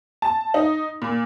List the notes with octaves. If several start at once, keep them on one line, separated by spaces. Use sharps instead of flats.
A5
D#4
A#2